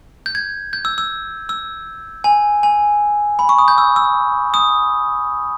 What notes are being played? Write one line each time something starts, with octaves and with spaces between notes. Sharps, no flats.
G6
G#6
G6
E6
E6
E6
G#5
G#5
B5
C#6
D#6
G6
E6
E6
D#6